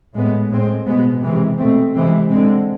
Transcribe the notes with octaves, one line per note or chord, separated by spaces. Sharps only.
A2 G#3 B3
A2 G#3 C4
B2 G#3 B3
C3 E3 G#3 C4
B2 A3 C4
C3 E3 G#3 C4
D3 G#3 C4